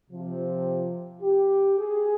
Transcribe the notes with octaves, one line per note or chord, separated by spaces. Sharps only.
C3 F3
G4
G#4